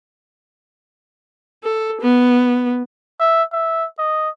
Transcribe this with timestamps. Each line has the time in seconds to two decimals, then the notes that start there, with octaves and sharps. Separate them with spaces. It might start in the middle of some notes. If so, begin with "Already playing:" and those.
1.64 A4
2.01 B3
3.20 E5
3.52 E5
3.98 D#5